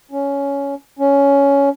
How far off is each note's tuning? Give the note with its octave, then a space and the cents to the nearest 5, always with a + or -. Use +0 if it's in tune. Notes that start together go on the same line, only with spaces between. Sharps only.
C#4 +10
C#4 +10